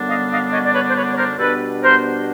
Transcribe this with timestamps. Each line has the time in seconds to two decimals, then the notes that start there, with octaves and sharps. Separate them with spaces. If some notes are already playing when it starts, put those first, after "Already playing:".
Already playing: F#2 D3 G3 B3 D4
0.08 D#5 F5
0.30 D#5 F5
0.51 C#5 D#5
0.64 D5
0.73 B4 C#5
0.87 C5
0.95 B4 C#5
1.10 C#5
1.16 A#4 C5
1.38 B2 G3 B3 D4 A4 B4
1.81 A#4 C5